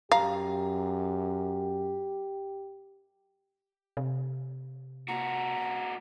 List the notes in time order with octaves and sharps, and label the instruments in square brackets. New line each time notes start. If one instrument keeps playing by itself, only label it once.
[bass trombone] F#2 [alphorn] G4 [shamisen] F5 [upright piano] A#5
[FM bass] C3
[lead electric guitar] A#2 F#4 [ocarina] A#5